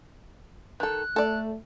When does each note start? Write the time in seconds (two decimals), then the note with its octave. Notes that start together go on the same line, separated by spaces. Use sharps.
0.80 D#3 A4 F#6
1.16 A3 A4 D5